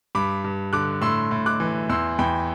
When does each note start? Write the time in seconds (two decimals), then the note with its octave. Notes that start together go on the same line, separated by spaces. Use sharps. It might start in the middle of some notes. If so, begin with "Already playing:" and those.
0.15 G2 B5 D6
0.44 G2
0.73 D3 D6 F#6
1.02 A2 C6 E6
1.31 A2
1.46 D6 F#6
1.60 E3
1.89 E2 C6 E6
2.19 E2 G5 B5